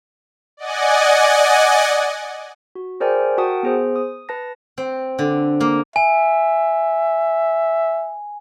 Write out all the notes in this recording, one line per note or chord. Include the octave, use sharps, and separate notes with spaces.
D5 D#5 F#5 G#5
F#4
G#4 A#4 C5 D5 G5 G#5
F#4 A#4 F#5 G5 A5 D#6
B3 G#4 C5
D#6
B4 A5 A#6
C4
D3
A#3
E5 G#5